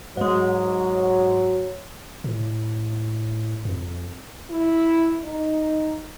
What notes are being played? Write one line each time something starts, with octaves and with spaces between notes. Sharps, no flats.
G#2 F#3 G#3
A2
F2
E4
D#4